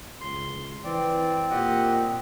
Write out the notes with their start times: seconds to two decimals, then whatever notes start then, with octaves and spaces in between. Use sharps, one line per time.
0.21 C#2 C6
0.84 E3 C4 D5
1.50 A#2 G4 D#5 F#5